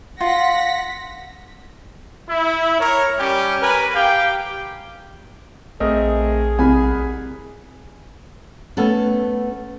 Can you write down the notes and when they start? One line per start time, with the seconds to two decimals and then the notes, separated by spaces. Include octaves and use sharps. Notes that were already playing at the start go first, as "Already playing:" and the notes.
0.21 F4 F#5 A#6 B6
2.28 E4
2.79 A#4 C#5
3.19 G3 C#4 G4
3.62 A#4 B4 G#5
3.94 G4 F5 G5
5.80 A#1 A3 C4 G#4 A#4 D#5
6.59 C2 G#5 B5
8.77 A3 B3 C#4 A4